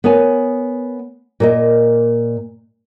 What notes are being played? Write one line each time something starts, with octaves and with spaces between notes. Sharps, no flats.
B3 A#4 C#5 G#5
A#2 A#4 D#5